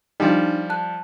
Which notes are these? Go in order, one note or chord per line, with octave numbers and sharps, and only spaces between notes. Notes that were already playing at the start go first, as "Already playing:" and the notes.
F3 G3 D4 D#4
A5 F#6